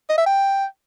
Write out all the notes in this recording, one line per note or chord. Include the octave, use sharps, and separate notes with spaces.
D#5
E5
G5